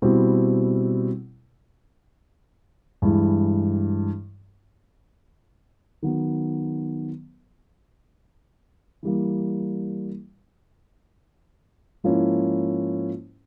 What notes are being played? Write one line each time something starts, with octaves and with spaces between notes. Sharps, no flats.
B2 G3 C4 E4
G2 E3 G#3
D#3 F#3 B3
E3 G3 A#3
G#2 F3 A#3 C#4 E4